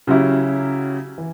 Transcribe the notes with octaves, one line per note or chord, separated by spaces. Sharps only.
C#3 F#3 C#4 E4 G4
E3